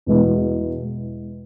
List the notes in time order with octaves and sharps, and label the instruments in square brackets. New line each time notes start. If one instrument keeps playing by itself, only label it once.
[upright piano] E2 B2 G#3 B3 E4